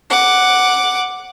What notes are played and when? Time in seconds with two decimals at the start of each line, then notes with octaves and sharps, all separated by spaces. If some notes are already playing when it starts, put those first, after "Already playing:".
0.10 F#5 D6